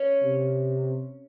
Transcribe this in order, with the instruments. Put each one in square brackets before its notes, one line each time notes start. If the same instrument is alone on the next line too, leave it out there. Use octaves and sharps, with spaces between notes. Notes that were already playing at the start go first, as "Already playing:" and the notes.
Already playing: [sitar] C#4
[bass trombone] C3